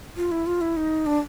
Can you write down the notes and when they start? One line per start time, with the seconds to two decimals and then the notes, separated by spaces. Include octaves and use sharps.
0.17 F4
0.32 E4
0.46 F4
0.61 E4
0.77 D#4
1.06 D4